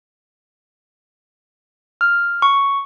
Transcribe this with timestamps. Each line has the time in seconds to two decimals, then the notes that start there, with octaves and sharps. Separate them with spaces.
2.01 F6
2.42 C#6